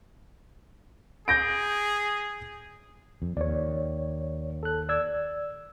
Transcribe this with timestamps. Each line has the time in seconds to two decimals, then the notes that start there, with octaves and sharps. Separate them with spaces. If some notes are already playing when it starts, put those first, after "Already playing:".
1.28 G#4 G6 A#6 D7
3.22 F2
3.37 D#2 C#5 D5
4.63 A4 F#6
4.89 D5 E6 G#6